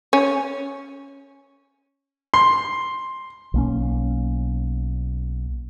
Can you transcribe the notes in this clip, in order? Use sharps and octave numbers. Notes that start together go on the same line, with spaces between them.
C#4
C6
B1 A#3 C#4